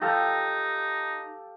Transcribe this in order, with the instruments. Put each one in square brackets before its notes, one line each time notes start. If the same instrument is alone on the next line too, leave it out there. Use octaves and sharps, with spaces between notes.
[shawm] D#4 [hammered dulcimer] G4 A4 F5